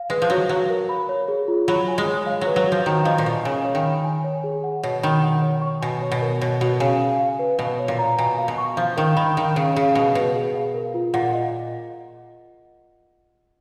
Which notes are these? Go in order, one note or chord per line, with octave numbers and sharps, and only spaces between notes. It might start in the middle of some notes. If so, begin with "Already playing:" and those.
Already playing: F5
G#3 B4
F3
F#3 F#4
F#3 F5
A#4
B5
C#5
G#4
F4
F#3 B5
G#5
G#3
C#5
F5
F#3
B4
F#3
F3 F#4
D#3 A#5
F3 D#5
A#2
B2 C#6
C#3 G#5
C#5
D#3
B5
G#5
C#5
G#4
F#5
B2 C#5
D#3 B5
F#5
C#5
C#6
B2 G#5
C#5
B2
A#4
B2 C#5
B2 F#4
C#3 G#5
G#5
F5
B4
B2 F5
C#5
A#2
A#5
B2 G#5
F5
B2
C#6
F3 F5
D#3 A#4
D#3 B5
D#3 F5
C#3 C#5
C#3 G#4
B2 F5
B2 B4
G#4
F5
A#4
F4
A#2 F#5
D#5